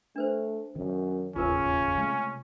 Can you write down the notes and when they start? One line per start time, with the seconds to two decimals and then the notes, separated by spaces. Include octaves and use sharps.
0.16 A3 D4 B4 C5
0.76 F#2 D#3
1.36 E1 A1 D#2 C#3 C#4 F4 A#4 B4
1.97 C3 G#3 A3